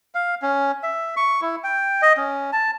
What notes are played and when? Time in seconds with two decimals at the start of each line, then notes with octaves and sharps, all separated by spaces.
0.15 F5
0.42 C#4
0.83 E5
1.17 C#6
1.42 E4
1.64 G5
2.02 D#5
2.18 C#4
2.53 A5